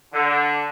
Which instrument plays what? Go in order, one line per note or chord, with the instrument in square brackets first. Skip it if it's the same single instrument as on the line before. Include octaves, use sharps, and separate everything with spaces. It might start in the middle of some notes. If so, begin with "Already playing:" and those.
[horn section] D3